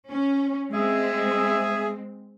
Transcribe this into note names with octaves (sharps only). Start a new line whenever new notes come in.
C#4
G#3 C4 G#4 E5